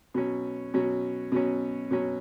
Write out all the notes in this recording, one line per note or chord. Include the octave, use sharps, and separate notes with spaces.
B2 F#3 C#4
B2 F#3 C#4
B2 F#3 C#4
B2 F#3 C#4